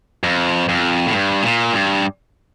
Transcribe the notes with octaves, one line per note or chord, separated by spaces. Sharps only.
F2
F2
A2
G2
A#2
G2